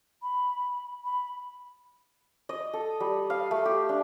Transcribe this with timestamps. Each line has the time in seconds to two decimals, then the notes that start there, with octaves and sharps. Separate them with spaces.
0.22 B5
1.05 B5
2.49 D#5
2.73 A4
3.00 G3
3.30 F5
3.51 A3
3.65 G4
3.89 D4